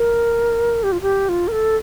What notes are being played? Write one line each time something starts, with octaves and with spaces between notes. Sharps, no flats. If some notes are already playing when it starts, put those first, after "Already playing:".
Already playing: A#4
G4
F4
G4
F4
A#4
A4